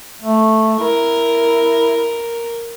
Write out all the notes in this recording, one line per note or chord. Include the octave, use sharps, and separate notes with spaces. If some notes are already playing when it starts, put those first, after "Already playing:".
A3
E4 A#4